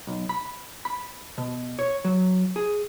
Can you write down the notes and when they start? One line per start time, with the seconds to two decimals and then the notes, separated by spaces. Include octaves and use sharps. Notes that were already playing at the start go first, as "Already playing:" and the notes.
0.07 B1
0.29 B5
0.85 B5
1.38 B2
1.79 C#5
2.05 F#3
2.56 G#4